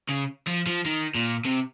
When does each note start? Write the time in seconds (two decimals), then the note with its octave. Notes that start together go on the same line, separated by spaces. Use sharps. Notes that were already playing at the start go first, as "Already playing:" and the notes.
0.09 C#3
0.47 F3
0.67 F3
0.86 D#3
1.16 A#2
1.45 C3